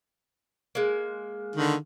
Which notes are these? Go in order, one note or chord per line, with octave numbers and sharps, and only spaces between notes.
G#3 A#3
D3 D#3